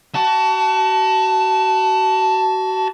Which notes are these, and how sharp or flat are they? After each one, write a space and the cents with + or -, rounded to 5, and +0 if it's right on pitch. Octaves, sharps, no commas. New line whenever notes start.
F#4 +30 A5 +0